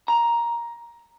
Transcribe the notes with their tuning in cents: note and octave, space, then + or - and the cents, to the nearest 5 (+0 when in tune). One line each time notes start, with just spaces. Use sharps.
A#5 +10